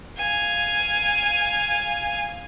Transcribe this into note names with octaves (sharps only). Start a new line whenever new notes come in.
F5 G#5